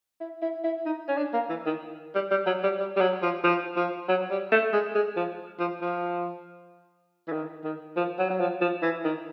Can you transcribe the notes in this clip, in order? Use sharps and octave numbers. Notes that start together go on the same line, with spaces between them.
E4
E4
E4
D#4
C#4
D4
A#3
E3
D#3
G3
G3
F#3
G3
G3
G3
F#3
F3
F3
F3
F#3
G3
A3
G#3
G#3
F3
F3
F3
E3
D#3
D#3
F3
F#3
F#3
F3
F3
E3
D#3